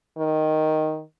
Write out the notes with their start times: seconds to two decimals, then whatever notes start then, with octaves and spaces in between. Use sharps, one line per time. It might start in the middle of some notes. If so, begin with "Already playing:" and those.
0.18 D#3